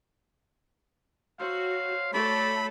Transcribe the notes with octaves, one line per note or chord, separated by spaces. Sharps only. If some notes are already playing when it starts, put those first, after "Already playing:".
F#3 F#4 C5 F5 E6
A3 A4 C#5 D5 B5